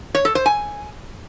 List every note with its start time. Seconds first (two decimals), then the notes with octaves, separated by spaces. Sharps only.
0.15 C#5
0.25 A4
0.35 C5
0.46 G#5